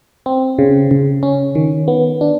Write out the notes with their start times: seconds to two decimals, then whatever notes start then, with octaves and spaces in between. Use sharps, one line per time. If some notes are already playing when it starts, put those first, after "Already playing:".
0.26 C4
0.59 C#3
0.91 C#3
1.23 C#4
1.55 D#3
1.88 B3
2.21 D4